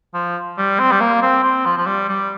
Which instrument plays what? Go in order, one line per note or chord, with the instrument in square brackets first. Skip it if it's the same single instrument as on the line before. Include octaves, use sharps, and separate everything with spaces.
[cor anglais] F3
G3
C4
G3
A#3
C4
C4
F3
F3
G3
G3